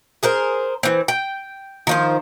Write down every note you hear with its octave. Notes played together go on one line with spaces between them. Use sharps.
G#4 A#4 C5
E3 C4
G5
D#3 F3 C5